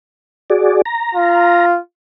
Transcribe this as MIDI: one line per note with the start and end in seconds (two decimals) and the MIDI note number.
0.50 0.82 66
0.50 0.82 68
0.50 0.82 74
0.86 1.65 82
1.15 1.79 65